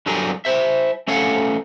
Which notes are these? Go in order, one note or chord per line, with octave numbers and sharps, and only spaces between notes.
G2 D3 F#3 G4 G#4 A#4
E4 C5 E5
A3 C#4 A4 C#5 F5 F#5